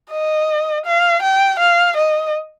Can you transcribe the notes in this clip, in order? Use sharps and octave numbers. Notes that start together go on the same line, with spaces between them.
D#5
F5
G5
F5
D#5